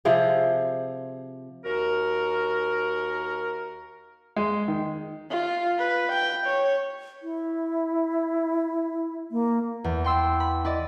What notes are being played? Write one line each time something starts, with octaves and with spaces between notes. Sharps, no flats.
C3 F3 G#4
D#2 F#4 A#4
G#3
D#3
F4
B4
G5
C#5
E4
A#3
E2
G5 C6 E6
B5
E4 D5 D#5